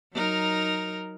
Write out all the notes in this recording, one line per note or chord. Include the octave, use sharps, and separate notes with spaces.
F#3 D#4 A#4